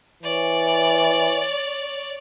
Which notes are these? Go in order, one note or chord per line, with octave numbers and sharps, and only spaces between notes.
E3 C#5 D5